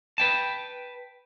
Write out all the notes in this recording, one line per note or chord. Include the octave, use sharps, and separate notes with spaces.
B4 G5 A5